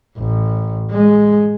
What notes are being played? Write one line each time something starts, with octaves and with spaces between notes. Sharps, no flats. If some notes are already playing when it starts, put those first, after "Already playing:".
A1
G#3